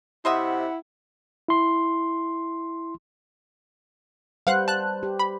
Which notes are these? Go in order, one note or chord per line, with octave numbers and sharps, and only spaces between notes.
C3 E4 C5 D#5 E5 F#5
E4 C6
G3 B4 C5 F5 F#5 F#6
A5 F#6
G4
B5